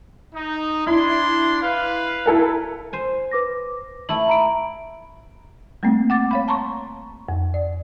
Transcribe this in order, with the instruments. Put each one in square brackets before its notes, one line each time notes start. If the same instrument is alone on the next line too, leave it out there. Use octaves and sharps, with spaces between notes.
[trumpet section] D#4
[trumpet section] D4 C6 [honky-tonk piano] E4
[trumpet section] B4 F5
[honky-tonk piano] E4 A4 A#4
[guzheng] C5 G#5
[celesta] B4 D6 A#6
[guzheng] A3 E4 [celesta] B5 F#7
[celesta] A#5 B5 D7
[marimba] G3 A3 A#3 C4
F#5 D6 A6
C#5 F5 B5
A5 A#5 C6 C#6
F2
D5